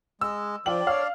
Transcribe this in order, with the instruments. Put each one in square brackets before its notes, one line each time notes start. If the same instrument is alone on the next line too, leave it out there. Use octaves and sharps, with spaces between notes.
[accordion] G#3 [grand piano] E6
[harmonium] F3 [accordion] D4 [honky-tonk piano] F4 G5 [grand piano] F#7
[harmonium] C#5 D5 [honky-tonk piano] F5 F6